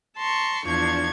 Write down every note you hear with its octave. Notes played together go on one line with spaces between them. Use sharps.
A5 A#5 C6 C#6
E2 F3 D4 C#6 G#6